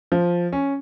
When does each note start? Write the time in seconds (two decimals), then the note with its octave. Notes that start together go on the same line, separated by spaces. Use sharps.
0.12 F3
0.53 C#4